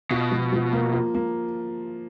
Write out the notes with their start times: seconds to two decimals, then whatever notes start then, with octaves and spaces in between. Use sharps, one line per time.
0.11 B2 F4
0.32 F3
0.53 F3
0.73 A#3
0.94 F4
1.15 A#3